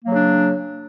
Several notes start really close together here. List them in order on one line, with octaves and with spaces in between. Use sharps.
A#3 F#3 C#3 D4